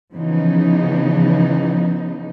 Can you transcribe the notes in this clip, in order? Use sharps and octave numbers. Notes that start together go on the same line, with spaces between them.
C#3 E3 F3 B3 D#4